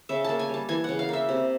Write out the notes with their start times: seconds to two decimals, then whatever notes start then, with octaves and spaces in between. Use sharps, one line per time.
0.09 C#3 E5
0.24 A#3 A5
0.39 G#5
0.49 G3 A5
0.69 E3 G#5
0.84 C#3 F#5
0.99 F5
1.09 A#3 E5
1.29 C3